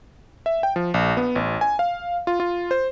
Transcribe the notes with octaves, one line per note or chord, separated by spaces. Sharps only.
E5
G5
F3
A#1
B3
A1
G#5
F5
F4
F4
C5